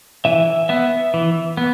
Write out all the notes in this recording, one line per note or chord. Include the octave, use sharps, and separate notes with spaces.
E3 E5
B3 E5
E3
B3